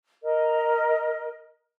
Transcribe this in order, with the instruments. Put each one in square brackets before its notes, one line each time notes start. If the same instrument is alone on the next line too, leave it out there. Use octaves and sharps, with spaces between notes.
[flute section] A#4 D#5